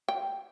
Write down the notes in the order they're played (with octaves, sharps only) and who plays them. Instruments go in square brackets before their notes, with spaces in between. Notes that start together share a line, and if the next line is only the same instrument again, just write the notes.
[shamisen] G5